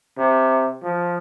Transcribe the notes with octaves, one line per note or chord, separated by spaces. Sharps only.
C3
F3